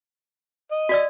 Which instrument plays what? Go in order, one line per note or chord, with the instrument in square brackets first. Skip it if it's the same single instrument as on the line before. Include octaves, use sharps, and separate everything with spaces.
[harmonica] D#5
[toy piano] F#4 D5 E6